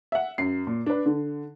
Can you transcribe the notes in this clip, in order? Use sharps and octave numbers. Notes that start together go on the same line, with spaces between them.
E5 F#5
F#2 C7
A#2
D4 B4
D3